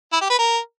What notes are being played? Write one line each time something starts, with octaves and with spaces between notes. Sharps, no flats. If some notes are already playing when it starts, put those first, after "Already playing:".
E4
G4
B4
A#4